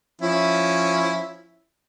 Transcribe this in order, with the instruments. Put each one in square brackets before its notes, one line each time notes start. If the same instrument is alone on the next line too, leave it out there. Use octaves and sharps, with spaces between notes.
[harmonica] F3 C#4 E4